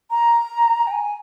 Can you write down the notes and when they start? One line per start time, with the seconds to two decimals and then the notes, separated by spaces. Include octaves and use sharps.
0.10 A#5
0.87 G5
0.91 G#5